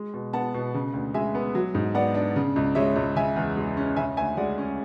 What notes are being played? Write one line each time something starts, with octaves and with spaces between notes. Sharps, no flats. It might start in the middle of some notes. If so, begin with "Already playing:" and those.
Already playing: G#3
B2
B3 F#5 A5
B2
C#3
D2
G#3 E5 G#5
B3
F#3
G#2
B3 D5 F#5
D4
C#3
C#2
G#3 C#5 E5
C#2
C#3 E5 G#5
E2
G#3
C#4
C#3 E5 G#5
D2 E5 G#5
G#3 D5 F#5
C#4